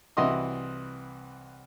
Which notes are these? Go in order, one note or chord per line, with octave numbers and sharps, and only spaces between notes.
C2 E3 F#4 D#5 C6 D#6